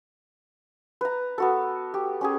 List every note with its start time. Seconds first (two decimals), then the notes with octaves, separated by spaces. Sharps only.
1.01 B4 A#5
1.38 B3 F#4 A4
1.94 G4
2.21 C#4 G4 G#4